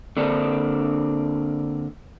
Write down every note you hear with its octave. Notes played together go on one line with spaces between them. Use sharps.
D3 A#3 C4 D4